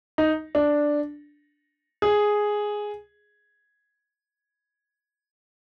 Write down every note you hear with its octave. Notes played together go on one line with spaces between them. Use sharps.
D#4
D4
G#4